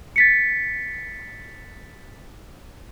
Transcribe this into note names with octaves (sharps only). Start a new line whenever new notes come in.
A6 B6 C#7